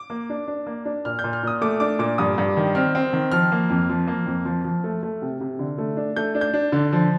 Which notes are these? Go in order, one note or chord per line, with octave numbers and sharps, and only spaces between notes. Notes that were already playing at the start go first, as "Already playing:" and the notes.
Already playing: D6
A#3
D4
D4
A#3
D4
A#2 F6
G6
A#2
F6
A#2 D#6
A3 D6
D4 D6
A#2 D6
G2 D#6
G2
D#3
C4 F6
C4
D#3
F3 F6
A#3
F2
F3
A#3
F2
F3
F3
A3
A3
C3
C3
D3
A3
D4
A3 G6
D4
G6
D4
D3
F3